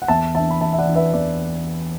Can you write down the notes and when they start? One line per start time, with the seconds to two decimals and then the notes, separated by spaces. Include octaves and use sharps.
0.02 F#5
0.08 E2 E5 A5
0.34 E3 E5 A5
0.38 D4
0.51 B5
0.61 E2 E5 A5
0.73 E5
0.78 D5 F#5
0.87 E3 D4
0.95 B4 E5
1.13 E2 D5